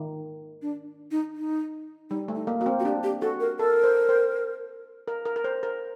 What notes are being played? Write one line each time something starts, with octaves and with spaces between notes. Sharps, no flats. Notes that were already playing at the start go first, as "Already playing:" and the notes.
Already playing: D#3
D4
D#4
D#4
G3 D#4
A3
D#4
A#3
A#3 F#4
C4
F#4
D4 G4
G4
F#4 A4
A#4
A4 A#4
C5
C5
A#4
A#4
A#4
C5
A#4